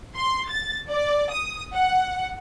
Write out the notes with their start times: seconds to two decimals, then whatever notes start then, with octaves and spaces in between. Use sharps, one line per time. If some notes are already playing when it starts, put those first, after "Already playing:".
0.17 C6
0.49 A6
0.89 D5
1.33 D#6
1.75 F#5